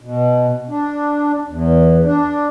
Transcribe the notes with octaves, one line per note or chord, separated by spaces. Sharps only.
B2
D4
E2
D4